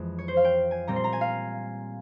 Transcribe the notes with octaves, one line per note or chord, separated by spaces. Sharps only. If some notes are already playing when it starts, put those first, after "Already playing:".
Already playing: F2 E3 G#3
C#5
C5
F5
G5
G#5
A#2 G3 C4 A#5
C6
A#5
G#5
F5